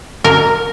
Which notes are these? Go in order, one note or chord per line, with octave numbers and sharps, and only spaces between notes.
A#4